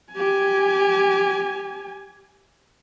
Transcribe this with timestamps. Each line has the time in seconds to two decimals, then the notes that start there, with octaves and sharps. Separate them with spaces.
0.13 G4 G#5